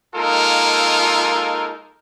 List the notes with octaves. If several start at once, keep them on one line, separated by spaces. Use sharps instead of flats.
G#3 A#3 D#4 F4 A4 A#4